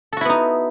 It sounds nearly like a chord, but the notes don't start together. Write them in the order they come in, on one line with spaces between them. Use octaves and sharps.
A4 F#4 E4 B3 D#4